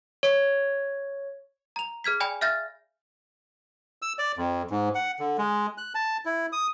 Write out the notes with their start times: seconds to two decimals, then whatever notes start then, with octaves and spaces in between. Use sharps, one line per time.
0.23 C#5
1.76 A#5 F7
2.04 G#4 F6 G#6 B6
2.20 D5 G5 G#5 B5
2.41 E5 F5 F6 G6 A6 A#6
4.02 E6
4.19 D5
4.37 F2
4.71 G#2
4.95 F#5
5.19 D3
5.38 G#3
5.78 F#6
5.95 A5
6.25 E4
6.52 D#6